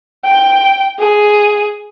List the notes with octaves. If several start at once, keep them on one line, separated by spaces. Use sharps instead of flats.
G5
G#4